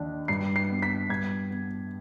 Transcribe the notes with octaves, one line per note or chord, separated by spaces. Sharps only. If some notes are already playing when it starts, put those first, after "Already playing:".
Already playing: D#2 D4
G2 C7
C7
B3
B6
G2 G#6
B3